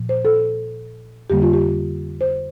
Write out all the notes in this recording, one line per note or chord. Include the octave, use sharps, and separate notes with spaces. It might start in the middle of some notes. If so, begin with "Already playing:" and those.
Already playing: A#2 F3
C5
A4
F2 D3 G3 A#3 G4
F4
G4
C5